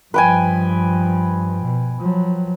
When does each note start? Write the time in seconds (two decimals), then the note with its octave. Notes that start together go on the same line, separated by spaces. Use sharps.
0.14 G2 F3 B4 G5 G#5
1.61 B2
2.00 F3 F#3